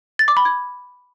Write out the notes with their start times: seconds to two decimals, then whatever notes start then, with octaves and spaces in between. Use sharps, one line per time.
0.19 A6
0.28 D6
0.37 B5
0.45 G#6